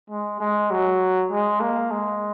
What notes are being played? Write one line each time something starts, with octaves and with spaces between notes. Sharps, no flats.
G#3
G#3
F#3
G#3
A#3
G#3